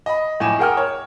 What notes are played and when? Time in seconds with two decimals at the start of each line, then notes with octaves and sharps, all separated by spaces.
0.06 D#5 B5
0.40 F2 A2 D#5 G#5 D6 E7
0.59 G#4 A#4 F#5 G5 D#6 F6
0.77 C#5